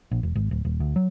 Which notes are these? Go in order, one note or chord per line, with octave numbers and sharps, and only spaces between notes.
A#1
E1
G#1
D1
D#1
D2
F#3